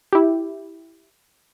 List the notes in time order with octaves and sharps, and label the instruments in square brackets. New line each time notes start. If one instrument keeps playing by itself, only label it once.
[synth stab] E4 G4